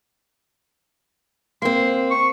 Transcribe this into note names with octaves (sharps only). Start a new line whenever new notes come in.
A#3 C4 C6
C#6